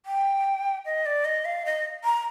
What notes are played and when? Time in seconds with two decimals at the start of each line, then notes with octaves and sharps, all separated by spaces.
0.06 G5
0.85 D#5
1.06 D5
1.25 D#5
1.45 F5
1.66 D#5
2.04 A#5